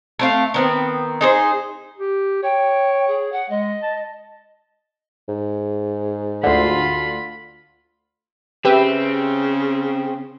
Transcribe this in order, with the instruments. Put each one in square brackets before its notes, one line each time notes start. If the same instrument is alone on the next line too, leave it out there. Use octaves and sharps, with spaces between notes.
[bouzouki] A3 C4 F5
D#3 B3 C4
D#4 G#4 C5
[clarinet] G4
[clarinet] C#5 [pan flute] G5
[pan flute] G#4
F#5
[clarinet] G#3 [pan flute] D#5
[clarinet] A5
[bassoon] G#2
[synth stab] D2 D3 [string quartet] F4 B5 C6
[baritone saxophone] C#3 [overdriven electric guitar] C4 [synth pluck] G4 B4 E5